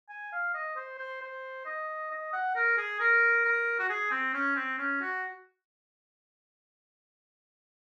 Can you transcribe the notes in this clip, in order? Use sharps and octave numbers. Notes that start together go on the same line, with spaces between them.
G#5
F5
D#5
C5
C5
C5
D#5
D#5
F#5
A#4
G#4
A#4
A#4
F#4
G#4
C4
C#4
C4
C#4
F#4